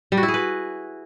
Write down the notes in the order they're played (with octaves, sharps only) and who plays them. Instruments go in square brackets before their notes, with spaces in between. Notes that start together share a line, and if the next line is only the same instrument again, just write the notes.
[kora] G3
F#4
E4
G#4
B4